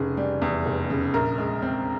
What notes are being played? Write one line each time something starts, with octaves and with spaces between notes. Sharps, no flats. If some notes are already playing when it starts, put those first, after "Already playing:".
Already playing: F1 C#3 G#4
G3
E2
F1
C#3
A#1 A#4
G#3
C4